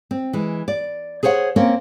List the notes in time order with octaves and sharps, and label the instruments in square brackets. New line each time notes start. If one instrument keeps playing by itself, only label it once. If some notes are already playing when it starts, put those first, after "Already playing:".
[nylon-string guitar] C4
E3 G#3
D5
G#4 C5 C#5 E5 F#5
A#3 C4 C#4 A#4